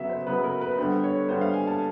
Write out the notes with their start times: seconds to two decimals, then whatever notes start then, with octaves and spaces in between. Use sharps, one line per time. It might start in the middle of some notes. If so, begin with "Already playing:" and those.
Already playing: C#3 F#3 B3 E5
0.09 C5
0.27 C#3 F#3 B3 B4
0.44 A#4
0.61 B4
0.78 D3 G3 B3 C5
1.04 C#5
1.29 D3 G3 B3 C5
1.41 F5
1.54 G#5
1.67 A5